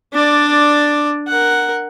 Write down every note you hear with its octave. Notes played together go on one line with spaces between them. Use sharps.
D4 D5
A#4 F#5